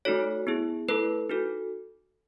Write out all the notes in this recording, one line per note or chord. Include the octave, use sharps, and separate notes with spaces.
A3 D#4 F#4 A4 C#5
B3 E4 G#4
A3 E4 A4 B4
D#4 F#4 A4